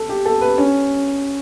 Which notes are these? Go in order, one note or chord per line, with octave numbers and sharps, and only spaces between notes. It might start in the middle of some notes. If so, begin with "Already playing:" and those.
Already playing: A4
G4
A4
B4
C#4